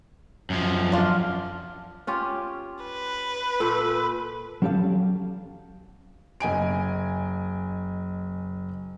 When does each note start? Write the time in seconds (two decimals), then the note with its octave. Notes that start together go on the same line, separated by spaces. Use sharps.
0.50 F#2 F3
0.92 D4 F4
2.07 C#4 F4 G4
2.84 B4
3.60 A#2 A4 B5
4.62 F#3 C#4 G4 A4 F5
6.40 F#1 D#5 G#5 D7